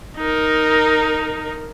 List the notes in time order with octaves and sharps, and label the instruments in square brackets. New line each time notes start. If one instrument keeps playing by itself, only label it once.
[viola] D#4 A#4